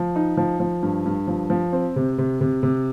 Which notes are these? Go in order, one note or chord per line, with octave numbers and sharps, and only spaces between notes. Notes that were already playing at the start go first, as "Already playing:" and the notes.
Already playing: F3
D#4
F3
F3
G2
G2
F3
F3
C4
C3
C3
C3
C3